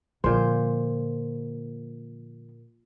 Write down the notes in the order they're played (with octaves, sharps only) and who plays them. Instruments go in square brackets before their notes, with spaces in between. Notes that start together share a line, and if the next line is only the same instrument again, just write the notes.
[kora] A#2 C5 [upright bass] D3 F3